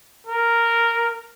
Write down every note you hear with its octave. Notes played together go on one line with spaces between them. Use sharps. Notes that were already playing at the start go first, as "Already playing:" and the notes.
A#4